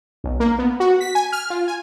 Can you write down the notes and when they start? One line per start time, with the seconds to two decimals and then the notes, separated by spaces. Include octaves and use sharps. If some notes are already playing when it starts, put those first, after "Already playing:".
0.24 B1
0.40 A#3
0.59 B3
0.80 F#4
1.01 B6
1.15 G#5
1.32 F6
1.50 F4
1.68 G#5